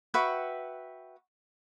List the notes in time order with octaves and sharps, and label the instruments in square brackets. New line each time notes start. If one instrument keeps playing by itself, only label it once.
[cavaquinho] F#4 B4 E5 G5